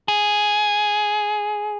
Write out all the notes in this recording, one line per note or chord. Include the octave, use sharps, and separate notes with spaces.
G#4